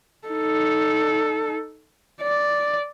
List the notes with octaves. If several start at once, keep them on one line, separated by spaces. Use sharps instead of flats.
D#4 A4
D5